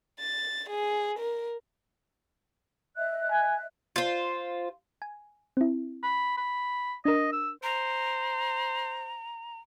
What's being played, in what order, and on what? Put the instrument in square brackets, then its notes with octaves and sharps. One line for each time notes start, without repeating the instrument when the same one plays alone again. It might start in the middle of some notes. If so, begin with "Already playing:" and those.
[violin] A6
G#4
A#4
[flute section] D#5 E5 F#6
[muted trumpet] G#5
[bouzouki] F4 C5
[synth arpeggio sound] G#5
C4 E4
[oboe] B5
B5
[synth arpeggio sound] D4 A#4 [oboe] D#5
[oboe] E6
[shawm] C5 [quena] A#5